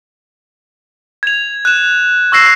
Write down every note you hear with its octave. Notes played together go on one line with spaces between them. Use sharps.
G#6 F7
F#6 E7
C#6 E6 A#6 C7 E7